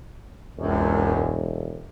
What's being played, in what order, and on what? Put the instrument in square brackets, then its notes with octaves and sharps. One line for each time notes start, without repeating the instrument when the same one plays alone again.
[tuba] E1 [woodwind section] C#2 F#2